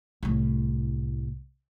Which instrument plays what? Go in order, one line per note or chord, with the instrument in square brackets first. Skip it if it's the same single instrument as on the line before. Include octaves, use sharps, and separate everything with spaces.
[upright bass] C2 A2